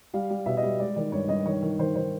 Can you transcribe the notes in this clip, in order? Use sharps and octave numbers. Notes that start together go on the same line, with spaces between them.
G3 F5
G3
B2 E5
D#5
G3
G#3 D5
D#3 D5
G2 C#5
G2 D#5
D#3 C#5
D#3
D#3 C5
D#3 C5